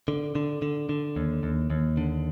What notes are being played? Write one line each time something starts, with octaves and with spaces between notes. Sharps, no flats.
D3
D3
D3
D3
D#2
D#2
D#2
D3